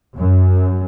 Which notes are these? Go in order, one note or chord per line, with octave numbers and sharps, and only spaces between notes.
F#2